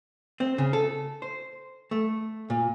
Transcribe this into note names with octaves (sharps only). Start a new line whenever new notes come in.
C4
C#3
A4
C5
A3
A#2